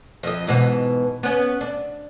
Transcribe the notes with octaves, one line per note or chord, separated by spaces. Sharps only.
F2 D#5
G#2 B2 E3
B3 C#4
D4